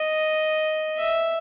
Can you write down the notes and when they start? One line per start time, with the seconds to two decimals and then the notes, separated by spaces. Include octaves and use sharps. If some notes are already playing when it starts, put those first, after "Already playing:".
Already playing: D#5
0.98 E5